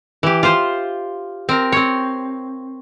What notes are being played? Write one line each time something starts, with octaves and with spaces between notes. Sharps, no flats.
E3 G4
F4 C5
C4 A#4
C4 C#5